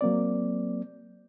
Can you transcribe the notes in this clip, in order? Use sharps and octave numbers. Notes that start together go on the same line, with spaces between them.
F#3 A#3 C4 D5